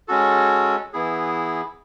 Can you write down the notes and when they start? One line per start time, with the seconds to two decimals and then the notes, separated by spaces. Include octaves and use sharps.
0.08 G#3 C#4 F#4 A4
0.93 E3 B3 E4 G#4